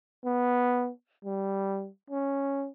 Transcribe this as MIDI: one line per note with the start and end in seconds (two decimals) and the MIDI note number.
0.25 0.90 59
1.25 1.89 55
2.10 2.68 61